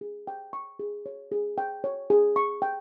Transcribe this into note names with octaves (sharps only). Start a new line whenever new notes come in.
G#4
G5
C#6
G#4
C#5
G#4
G5
C#5
G#4
C#6
G5